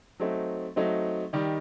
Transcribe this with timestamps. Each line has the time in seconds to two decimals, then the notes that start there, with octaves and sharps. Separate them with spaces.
0.20 F#3 A3 C4 D#4
0.76 F#3 A3 C4 D#4
1.33 D#3 G3 D#4 G4